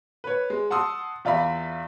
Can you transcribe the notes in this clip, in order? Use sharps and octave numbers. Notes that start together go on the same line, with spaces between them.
B4 C#5
G#3
F#5 A5 C6 D#6 E6
E2 F4 D5 E5 B5